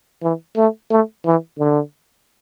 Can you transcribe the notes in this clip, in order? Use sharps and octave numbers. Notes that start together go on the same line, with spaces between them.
E3
A3
A3
E3
D3